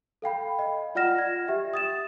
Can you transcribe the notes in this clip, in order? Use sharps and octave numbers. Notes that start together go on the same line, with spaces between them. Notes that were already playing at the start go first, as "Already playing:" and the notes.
A4 F5 G5 B5
D#5
F4 D5 F#5 F6 A#6 E7
G#6
G4 E5 G5
D#6 A6 E7